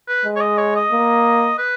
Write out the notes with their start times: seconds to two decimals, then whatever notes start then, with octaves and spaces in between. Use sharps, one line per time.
0.08 B4
0.26 G#3
0.36 C#5
0.41 D#5
0.58 C#5
0.76 D#5
0.92 A#3
1.58 B4